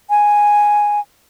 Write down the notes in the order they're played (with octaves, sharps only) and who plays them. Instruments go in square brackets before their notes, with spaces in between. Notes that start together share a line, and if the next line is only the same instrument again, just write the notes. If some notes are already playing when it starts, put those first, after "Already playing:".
[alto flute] G#5